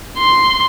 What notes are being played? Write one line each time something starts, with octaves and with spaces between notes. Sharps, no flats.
C6